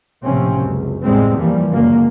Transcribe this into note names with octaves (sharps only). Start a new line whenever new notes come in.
A#1 A2 C3 F3 C4 C#4
F#1 C#2
E2 A2 G3 G#3 C4
E3 F3 G3 A#3
C#2 F#2 A#2 D3 A#3